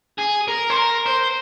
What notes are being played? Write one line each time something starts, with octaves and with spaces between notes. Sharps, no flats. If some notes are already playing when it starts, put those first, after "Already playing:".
G#4
A#4
C5
A#4
C5